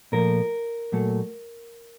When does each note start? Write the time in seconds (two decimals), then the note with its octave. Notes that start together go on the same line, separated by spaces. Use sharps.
0.12 A#2 F3 A3 A#4
0.92 A#2 F#3 A3